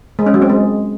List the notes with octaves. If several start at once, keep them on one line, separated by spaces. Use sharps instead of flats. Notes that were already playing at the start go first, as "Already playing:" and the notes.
G#3
C#4
F#3
C4
G#3